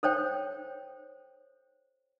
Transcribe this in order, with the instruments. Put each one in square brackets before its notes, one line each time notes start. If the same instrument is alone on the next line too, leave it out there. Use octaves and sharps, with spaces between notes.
[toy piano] A4 C5 C#5 G5